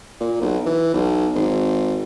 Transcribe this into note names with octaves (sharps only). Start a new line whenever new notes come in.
A#2
B1
E3
B1
G#1